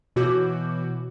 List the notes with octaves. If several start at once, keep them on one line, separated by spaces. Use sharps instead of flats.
B2 E3 F#4 C#5 D6 G6